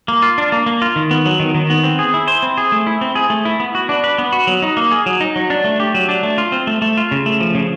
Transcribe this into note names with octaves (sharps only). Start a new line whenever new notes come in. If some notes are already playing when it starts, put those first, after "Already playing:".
A#3
F4
D4
A#3
A#3
F4
D#3
B3
F#3
D#3
D#3
B3
C4
G#4
E4
C5
C4
G#4
A3
E4
C4
G#4
A3
E4
B3
F#4
D4
B4
B3
F#4
F#3
D#4
A#3
G#4
F#3
D#4
F#3
D4
A3
G4
F#3
D4
A3
F4
C4
A3
A3
F4
C#3
A3
F3
C#3